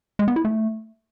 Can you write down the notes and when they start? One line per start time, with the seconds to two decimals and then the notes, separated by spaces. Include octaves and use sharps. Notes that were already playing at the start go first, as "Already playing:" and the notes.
0.19 G#3
0.28 B3
0.36 E4
0.45 A3